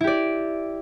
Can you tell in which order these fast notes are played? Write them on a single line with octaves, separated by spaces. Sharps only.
E4 G4 D5